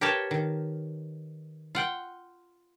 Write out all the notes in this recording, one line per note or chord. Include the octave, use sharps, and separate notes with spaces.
G4 A#4 B4 C#5 G5 A5
D#3
F4 F#5 G5